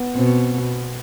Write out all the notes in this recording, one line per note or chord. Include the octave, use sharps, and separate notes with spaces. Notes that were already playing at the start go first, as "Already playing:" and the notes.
Already playing: B3
B2 C4